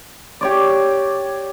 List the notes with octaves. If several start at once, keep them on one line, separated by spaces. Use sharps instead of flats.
G4 C#5 D5